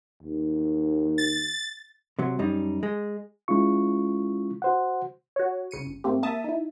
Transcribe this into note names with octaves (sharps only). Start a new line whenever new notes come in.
D#2
A6
C3 F#3
F#2 G3 D#4
G#3
G#3 C#4 E4 F4 C#6
F#4 C5 F#5
F#4 C#5
C2 C#3 C#7 D#7
G1
G#2 A3 A#3 C4 G4
A#3 E5 A5 D#6
D#4 E4